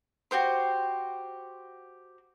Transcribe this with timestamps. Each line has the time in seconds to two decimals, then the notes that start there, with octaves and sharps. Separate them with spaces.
0.31 F#4 G4 C5 C6